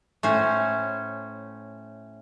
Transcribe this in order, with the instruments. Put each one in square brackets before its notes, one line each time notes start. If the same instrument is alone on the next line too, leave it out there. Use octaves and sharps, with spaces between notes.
[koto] A2 C#4 C5